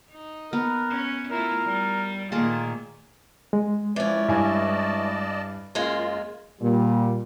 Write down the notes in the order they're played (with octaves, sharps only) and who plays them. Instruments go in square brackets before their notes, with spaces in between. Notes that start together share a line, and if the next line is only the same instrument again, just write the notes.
[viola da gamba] D#4
[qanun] B3 [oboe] A#4
[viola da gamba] C#4
[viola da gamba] A3 E4 F4 [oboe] A#4
[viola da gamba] G3
[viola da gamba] A#2 D#3 A3 [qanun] A#3 G#4 A5 [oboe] F4
[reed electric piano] G#3
[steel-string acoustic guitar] E3 C#4 [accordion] F3 D5
[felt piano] G2 E4 G#5 [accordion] D5 D#5 A5
[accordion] F#2 F4 [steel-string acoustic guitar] G#3 A#3
[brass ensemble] A#2 G3